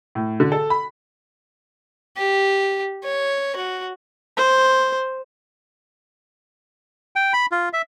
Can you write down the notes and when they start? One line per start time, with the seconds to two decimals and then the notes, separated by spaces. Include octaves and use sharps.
0.15 A2
0.40 D3
0.52 A4
0.70 B5
2.17 G4
3.04 C#5
3.56 F#4
4.37 C5
7.16 G5
7.33 B5
7.52 F4
7.73 E5